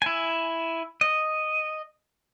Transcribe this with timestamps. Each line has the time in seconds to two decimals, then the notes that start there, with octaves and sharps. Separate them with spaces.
0.02 E4 G#5
1.01 D#5